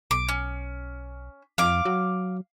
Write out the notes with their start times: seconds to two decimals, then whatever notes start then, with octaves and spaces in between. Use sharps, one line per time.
0.11 B1 D6
0.29 C#4
1.58 F2 F5 D6
1.85 F#3